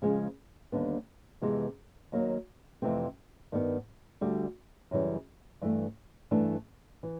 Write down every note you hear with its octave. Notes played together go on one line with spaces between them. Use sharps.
C#3 F3 G#3 C#4
D#2 D3 G3 B3 D4
F2 C3 E3 G#3 B3
D#2 D#3 F#3 A#3
F2 C3 E3 A3 C4
G2 D#3 G3 B3
D2 D3 G3
F#2 C#3 E3 G3
G2 E3 A3
G2 E3 A3 D4
E3